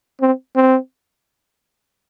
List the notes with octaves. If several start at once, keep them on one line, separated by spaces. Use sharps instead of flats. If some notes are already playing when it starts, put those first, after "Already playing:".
C4
C4